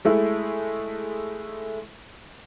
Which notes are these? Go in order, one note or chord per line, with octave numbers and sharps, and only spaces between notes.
G#3 A3 E4